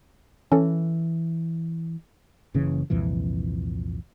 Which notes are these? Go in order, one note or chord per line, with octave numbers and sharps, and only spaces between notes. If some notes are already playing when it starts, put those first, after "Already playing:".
E3 C#4 A4
F#1 C#3 E3 C#4
C2 F2 A#2 E3